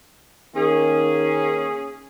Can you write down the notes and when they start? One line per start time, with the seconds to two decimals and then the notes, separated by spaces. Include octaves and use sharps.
0.55 D#3 A#3 C#4 G#4